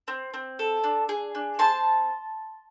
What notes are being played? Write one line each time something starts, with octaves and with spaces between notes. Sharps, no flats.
C4
C4
A4
D4
G#4
D4
C4 A5 C6